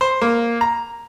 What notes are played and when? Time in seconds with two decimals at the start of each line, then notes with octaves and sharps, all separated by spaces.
0.01 C5
0.22 A#3
0.61 A#5